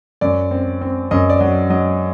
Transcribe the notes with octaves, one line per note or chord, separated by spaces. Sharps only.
F#2 D5
C4
C4
F#2 D#5
D5
F#3 D#5
F#3 D#5